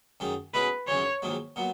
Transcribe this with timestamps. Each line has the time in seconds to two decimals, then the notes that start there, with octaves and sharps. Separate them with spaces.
0.20 F#2 D#3 G#3
0.54 B2 G#3 C#4 E4 B4
0.88 F#2 C#3 E3 C#5
1.22 A#1 G#2 D#3 F#3 A#3
1.56 A#2 F#3 B3